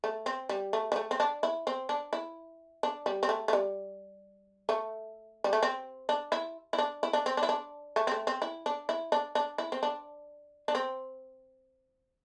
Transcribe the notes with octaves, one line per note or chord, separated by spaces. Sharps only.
A3
C4
G3
A3
G3
A3
C4
D4
E4
C4
D4
E4
D4
G3
C4
A3
A3
G3
A3
G3
A3
C4
D4
E4
E4
D4
E4
D4
C4
D4
E4
D4
A3
C4
A3
C4
E4
D4
E4
D4
D4
E4
C4
D4
D4
C4